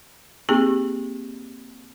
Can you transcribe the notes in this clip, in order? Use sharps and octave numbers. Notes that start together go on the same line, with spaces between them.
A#3 C4 D#4 G4 G#4